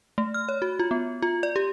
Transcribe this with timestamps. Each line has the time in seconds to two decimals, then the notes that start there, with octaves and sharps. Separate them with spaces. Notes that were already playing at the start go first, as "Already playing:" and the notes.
0.18 A3
0.34 F6
0.49 C#5
0.62 F#4
0.79 F4
0.91 B3
1.22 F4
1.43 D5
1.56 G4